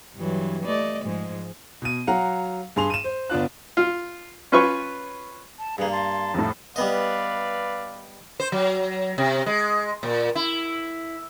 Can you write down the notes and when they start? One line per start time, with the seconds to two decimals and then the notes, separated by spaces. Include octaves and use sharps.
0.16 G2 E3 F#3
0.65 A3 D5 D#5
1.04 G#2 F3 G#3
1.82 B2 D#7
2.07 F#3 F5 F#5 A#5
2.76 G2 G#4 C6 F7
2.90 D#7 E7
3.04 C5
3.30 G1 B3 D4 F4 F#6
3.77 F4
4.52 C#4 F4 B4 C#5 C#6
5.59 A5
5.78 G2 A#3 G#4 B4
5.92 A5 C6
6.34 F1 A2
6.76 G3 B3 B4 D5 D#5 F5
8.40 C5
8.52 F#3
9.18 C3
9.46 G#3
10.03 A#2
10.35 E4